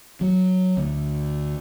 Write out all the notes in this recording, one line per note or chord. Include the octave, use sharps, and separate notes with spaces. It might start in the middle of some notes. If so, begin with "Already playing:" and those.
F#3
D2